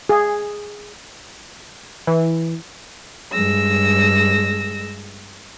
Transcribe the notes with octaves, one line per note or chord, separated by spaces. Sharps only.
G#4
E3
G2 G#3 E6 A#6